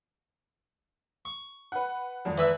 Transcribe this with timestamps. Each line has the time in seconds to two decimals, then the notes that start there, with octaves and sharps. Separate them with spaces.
1.25 C#6
1.72 B4 F#5
2.25 G#1 F2
2.38 E3 B4 E5